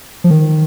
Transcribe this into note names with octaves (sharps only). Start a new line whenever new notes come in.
F3
D#3